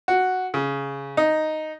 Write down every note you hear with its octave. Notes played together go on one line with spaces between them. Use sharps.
F#4
C#3
D#4